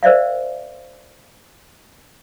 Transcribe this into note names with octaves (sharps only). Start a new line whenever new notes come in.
A#4 C5 D5 E5 F5